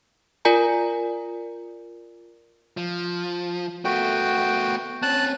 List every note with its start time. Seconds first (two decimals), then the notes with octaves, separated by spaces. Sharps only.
0.45 F4 A#4 D5 G#5 A#5
2.77 F3
3.85 A3 B3 F#4 G5
5.03 C4 C#4 A5 F#6